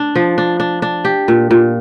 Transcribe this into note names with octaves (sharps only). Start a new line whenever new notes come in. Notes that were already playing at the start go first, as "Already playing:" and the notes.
Already playing: D4
F3
D4
D4
D4
G4
A#2
A#2